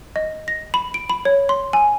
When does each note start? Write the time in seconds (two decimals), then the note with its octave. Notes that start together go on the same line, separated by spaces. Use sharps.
0.16 D#5
0.48 A#6
0.74 B5
0.94 D7
1.10 B5
1.25 C#5
1.49 C6
1.73 G#5